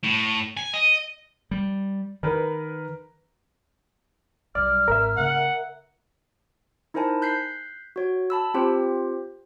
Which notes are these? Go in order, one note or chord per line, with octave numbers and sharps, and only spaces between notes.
A2
G#5
D#5
G3
D#3 A#4 B4
B1 G3 D5 F6
G#1 A#4 E5
C#3 A#3 F#5
D#4 E4 A#4 C5 G#5 A5
F#6 G6 B6 C7
F#4 C#5
A5 B5 E6
C4 F4 G4 C5